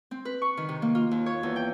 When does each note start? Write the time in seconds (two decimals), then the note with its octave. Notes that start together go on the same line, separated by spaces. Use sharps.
0.11 C4
0.25 B4
0.42 C#6
0.57 D#3
0.69 C3
0.82 A#3
0.95 F4
1.11 D#2
1.26 C#5
1.43 E2
1.56 G5